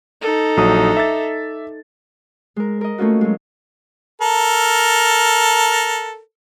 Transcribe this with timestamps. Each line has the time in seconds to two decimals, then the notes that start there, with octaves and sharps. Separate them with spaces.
0.22 D#4 A4
0.57 A#1 F#3 D#6
0.97 E5 D6 A6
2.56 G#3 A#4
2.81 A#4 D#5
2.98 A3 A#3 C#4 F4 F#4
3.21 F#3 G#3
4.21 A4 A#4